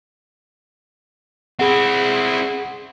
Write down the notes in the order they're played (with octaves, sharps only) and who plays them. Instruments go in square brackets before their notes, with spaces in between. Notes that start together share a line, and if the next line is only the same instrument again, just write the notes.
[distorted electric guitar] C4 E4 [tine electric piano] G#4 F#5